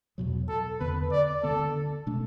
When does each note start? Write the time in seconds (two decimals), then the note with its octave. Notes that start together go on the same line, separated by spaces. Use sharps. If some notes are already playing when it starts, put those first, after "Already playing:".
0.18 E2 B2 F#3
0.49 A4
0.80 E2 D3 B3 B4
1.12 D5
1.43 D2 D3 B3 A4
2.07 B2 A3 D4